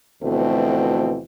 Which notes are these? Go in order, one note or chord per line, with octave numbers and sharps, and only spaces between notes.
D2 B2 E3 F3 A3 C4